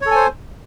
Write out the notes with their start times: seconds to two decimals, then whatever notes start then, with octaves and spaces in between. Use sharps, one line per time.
0.02 C#5
0.06 A4
0.11 G#5
0.16 C5